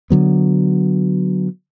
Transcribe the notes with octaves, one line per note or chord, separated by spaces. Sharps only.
D3 F#3 B3